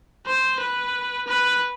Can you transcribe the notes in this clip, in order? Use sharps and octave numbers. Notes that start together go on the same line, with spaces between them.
C5
B4
B4